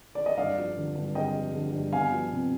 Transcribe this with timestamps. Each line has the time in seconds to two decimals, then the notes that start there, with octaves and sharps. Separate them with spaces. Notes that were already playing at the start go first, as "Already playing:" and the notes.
0.15 D5
0.26 D#5
0.38 G2 D5 F5
0.57 F3
0.77 D3
0.95 G2
1.15 G2 D#5 G5
1.35 F3
1.54 D3
1.74 G2
1.93 B3 F5 G#5
2.12 F3
2.32 C3